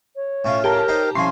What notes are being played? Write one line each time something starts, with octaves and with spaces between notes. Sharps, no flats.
C#5
A2 C#4 F4 C#6
G4 A#4 A5 A#5
D#4 C5 G5
C2 F3 C#4 G#5 C6 C#6 C7